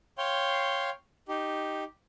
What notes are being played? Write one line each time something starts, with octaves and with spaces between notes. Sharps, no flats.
C#5 F5 G5 C6
D#4 G4